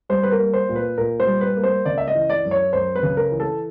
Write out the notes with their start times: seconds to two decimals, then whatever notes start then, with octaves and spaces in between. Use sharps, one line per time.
0.09 G3 C5
0.23 B4
0.32 A#4
0.39 A#3
0.54 C5
0.69 A#2
0.76 B4
0.98 A#2 A#4
1.20 C5
1.27 G3
1.41 B4
1.57 A#3
1.63 C5
1.85 C#3 D5
1.98 E5
2.08 D#5
2.15 E3
2.30 D5
2.45 F#2
2.51 C#5
2.73 F#2 C5
2.96 B4
3.03 C#3
3.17 A#4
3.32 E3
3.40 A4